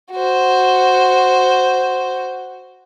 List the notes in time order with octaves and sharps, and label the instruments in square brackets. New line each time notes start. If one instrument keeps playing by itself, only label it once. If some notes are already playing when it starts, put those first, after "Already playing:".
[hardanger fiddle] F#4 C5